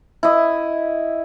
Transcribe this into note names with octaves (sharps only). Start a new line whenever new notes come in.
E4 D#5